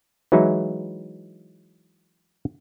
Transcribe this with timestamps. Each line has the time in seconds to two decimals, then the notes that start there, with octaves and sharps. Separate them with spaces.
0.32 E3 F#3 G#3 D#4 E4